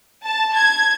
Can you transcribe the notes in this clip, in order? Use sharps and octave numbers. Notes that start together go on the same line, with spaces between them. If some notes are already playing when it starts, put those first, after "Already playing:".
A5
G#6